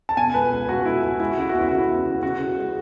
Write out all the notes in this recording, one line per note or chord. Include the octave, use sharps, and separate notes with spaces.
A5
B2 G#5
C#2 B4
C#2
C#2 F#4
C#2 E4
C#2 E4
G#3 E4
F#4
C#3 E4
F#4
E2 E4
C#3 F#4
E4
E2
C#3
C#3 F#4
C#3
G#3